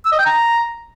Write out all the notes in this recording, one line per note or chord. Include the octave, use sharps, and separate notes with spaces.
E6
D#5
G5
A#5